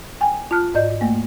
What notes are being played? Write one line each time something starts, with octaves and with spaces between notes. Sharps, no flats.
G5 G#5
F4 A5 F6 F#6
G#2 D5 D#5 G6
A3 A#3